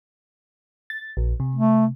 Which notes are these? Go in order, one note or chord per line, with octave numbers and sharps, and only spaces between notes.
A6
A#1
C3
A3